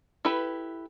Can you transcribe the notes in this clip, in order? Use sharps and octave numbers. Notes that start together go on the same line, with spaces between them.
E4 G4 A4 B4 B5